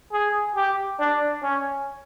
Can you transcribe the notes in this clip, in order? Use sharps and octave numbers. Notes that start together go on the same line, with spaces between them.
G#4
G4
D4
C#4